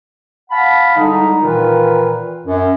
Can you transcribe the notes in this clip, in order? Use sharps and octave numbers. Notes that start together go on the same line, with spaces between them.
F5 F#5 A5 B5
C2 D3 G#3 D#4
A#2 D#3 E3 F4 A#4 B4
F#2